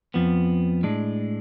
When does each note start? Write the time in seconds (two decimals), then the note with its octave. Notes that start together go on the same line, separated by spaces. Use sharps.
0.14 F2 F3 B3
0.83 A2 G#3 D4